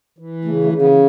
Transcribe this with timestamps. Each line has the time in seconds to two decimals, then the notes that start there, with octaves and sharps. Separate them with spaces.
0.18 E3
0.45 C#3 A3
0.64 A3
0.73 C#3
0.82 B3